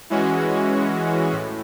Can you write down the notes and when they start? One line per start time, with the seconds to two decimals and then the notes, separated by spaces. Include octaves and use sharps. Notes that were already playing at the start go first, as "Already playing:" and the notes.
0.10 E3 G#3 C#4 F#4
1.32 A2